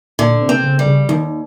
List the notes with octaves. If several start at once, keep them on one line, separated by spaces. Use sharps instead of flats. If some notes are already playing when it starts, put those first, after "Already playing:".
A#2 D3
C3
C4
C#3
G3
C#3
D#2 D#3